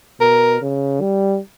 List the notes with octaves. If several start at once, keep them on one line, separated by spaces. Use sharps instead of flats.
B2 A#4
C#3
G3